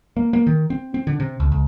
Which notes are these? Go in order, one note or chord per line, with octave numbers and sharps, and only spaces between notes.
A#3
A#3
D#3
C4
C4
D3
C3
C#2
C#2